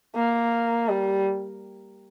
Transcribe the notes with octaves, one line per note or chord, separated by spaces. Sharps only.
A#3
G3